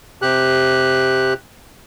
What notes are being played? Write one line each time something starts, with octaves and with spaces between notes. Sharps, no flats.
C3 G4 F#6